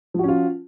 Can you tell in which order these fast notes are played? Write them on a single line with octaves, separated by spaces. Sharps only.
F3 F#4 C#4 F4